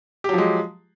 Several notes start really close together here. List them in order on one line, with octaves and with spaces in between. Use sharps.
G4 F#3 F3 G#3